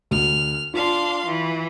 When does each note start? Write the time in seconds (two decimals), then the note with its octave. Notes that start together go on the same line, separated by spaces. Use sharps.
0.11 D2 F6
0.74 D4 F4 F5 C6
1.26 E3